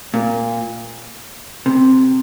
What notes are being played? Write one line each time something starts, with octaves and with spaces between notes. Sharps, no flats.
A#2
C3